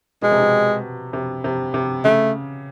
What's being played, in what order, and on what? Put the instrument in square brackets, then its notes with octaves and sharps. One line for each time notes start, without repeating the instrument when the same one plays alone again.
[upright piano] B2 [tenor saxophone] G#3
[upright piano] C3
B2
C3
C3
C3
[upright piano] C#3 [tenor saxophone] A3